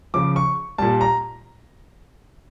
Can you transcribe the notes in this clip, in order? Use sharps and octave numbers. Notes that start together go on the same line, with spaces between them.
C#3 F3 D6
C#6
A#2 G3 A5
A#5